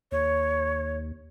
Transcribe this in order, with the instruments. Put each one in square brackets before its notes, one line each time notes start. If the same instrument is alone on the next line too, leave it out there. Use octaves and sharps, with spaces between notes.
[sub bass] D#2 [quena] C#5